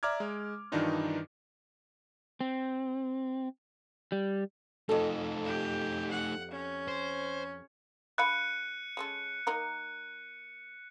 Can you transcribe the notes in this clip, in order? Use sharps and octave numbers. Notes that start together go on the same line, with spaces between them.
D5 E5 A#5 D6 F6 G#6
G#3
G2 D#3 E3 D4 D#4 F4
C4
G3
F2 A3 D#4 A4
G4
F#5
C#4
C5
D3 F5 B5 F#6 C#7 D#7
G#3 C#4 A4
A#3 D#4 A#4